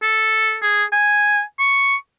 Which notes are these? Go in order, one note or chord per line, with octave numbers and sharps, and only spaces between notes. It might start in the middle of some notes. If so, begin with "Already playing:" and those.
A4
G#4
G#5
C#6